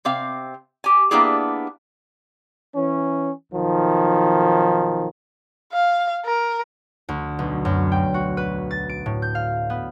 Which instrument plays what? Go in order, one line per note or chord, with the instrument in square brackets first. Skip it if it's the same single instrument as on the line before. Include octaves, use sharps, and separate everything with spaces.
[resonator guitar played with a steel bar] C3 C4 F5
G4 G#5
A#3 B3 D4 E4 G4 G#4
[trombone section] E3 C#4
B1 D#3 F3
[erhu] F5
A#4
[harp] D2
B1
F#2
G5
F#4
B4
A6
D7
A2
G6
F5
B3